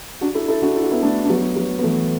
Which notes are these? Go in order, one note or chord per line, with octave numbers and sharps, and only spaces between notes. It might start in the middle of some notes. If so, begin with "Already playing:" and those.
D4 F#4
E4 A4
E4 A4
D4 F#4
E4
F#4
B3 E4
A3 D4
D4
F#3 B3
F#3 B3
B3
E3 A3